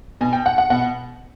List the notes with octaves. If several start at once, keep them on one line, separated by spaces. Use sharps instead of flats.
B2 G#5
G5
F#5
F#5
B2 F#5